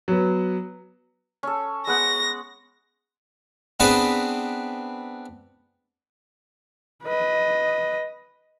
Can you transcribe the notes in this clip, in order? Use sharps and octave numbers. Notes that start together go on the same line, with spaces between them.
F#3 B3
C#4 A4
G#3 B3 F#5 A#6
B3 C4 D4 G#4 B4
B4 D#5